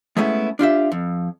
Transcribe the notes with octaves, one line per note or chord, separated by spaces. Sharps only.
G#3 A3 B3 C#4 E4
D4 F4 G4 E5
F2